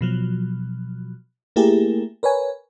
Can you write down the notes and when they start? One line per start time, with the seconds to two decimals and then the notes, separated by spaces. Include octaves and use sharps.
0.01 B2 F3 F#3
1.56 A3 A#3 E4 G4 G#4 A#4
2.23 A#4 B4 C#5 G#5